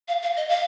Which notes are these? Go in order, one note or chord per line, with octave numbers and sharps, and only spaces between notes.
F5
F5
D#5
F5